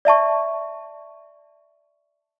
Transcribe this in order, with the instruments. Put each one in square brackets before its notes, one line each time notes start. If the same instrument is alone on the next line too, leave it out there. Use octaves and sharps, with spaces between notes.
[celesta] D5 E5 A5 C#6